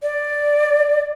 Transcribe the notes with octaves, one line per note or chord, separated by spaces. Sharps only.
D5